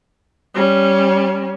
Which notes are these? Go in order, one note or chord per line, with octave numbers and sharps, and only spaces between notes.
G3 C#4